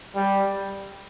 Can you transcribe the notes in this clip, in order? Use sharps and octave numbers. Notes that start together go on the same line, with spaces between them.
G3